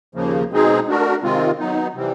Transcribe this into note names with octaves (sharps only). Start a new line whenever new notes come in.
D#2 C#3 F3 A#3
B2 G#3 C4 D#4 G#4
A3 D4 F#4 A#4
C3 D#3 G#3 C4 F4
F#3 B3 D#4
C3 E3 G3 C4